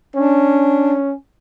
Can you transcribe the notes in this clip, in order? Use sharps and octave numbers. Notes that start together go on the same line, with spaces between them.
C#4 D4